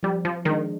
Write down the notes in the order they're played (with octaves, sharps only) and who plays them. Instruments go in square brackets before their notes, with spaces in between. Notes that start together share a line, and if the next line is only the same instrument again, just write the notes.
[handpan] F3 [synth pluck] G3
[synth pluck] F3
[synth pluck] D#3 [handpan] G#3 D4